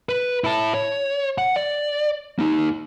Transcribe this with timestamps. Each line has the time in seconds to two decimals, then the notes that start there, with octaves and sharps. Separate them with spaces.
0.09 B4
0.44 E4 A5
0.74 C#5
1.38 F#5
1.56 D5
2.39 A#3 D#4